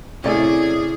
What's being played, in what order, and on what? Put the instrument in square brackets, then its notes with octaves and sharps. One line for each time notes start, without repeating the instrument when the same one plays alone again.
[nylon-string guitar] C3 A3 [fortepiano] C#4 D5 [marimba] E4 D#5 G#5 [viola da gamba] G#4